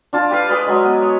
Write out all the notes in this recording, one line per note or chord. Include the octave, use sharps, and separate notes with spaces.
D4 F4 A5
G4 B4 F5
G#4 B4 D5 D#5
F#3 G#3
B3
C#5